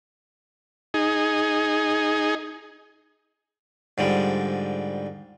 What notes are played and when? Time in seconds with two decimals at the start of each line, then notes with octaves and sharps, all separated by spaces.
0.94 D#4 G#4
3.98 G#2 D3 F3 G3